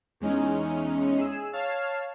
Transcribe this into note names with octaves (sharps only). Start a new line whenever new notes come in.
E2 G#3 C#4 D#4
G#4 E6
C#5 F5 A5